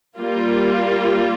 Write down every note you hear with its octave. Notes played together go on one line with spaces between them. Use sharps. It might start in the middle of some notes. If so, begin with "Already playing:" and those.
G3 A#3 F4